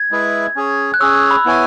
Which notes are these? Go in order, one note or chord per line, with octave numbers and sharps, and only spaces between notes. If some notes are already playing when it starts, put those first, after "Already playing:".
Already playing: G#6
G#3 E4 G#4 B4 E5
C#4 G#4 C#5
F#6
C#4 G#4 C#5 E6
E6
B5
B3 E4 C#5 G#5